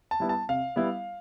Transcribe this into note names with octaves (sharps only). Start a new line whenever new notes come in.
A5
G3 B3 E4
A5
C3 F5
G3 B3 E4